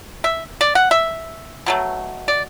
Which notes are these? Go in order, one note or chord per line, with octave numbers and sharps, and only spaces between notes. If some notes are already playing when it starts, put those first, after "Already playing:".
E5
D5
F#5
E5
B2 F#3 A3
D5